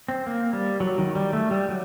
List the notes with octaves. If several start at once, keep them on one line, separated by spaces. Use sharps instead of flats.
C4
A#3
G3
F#3
D#3
G3
A3
G3
F#3